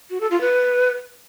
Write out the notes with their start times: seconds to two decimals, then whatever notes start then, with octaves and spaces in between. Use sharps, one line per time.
0.10 F#4
0.21 A4
0.31 F4
0.41 B4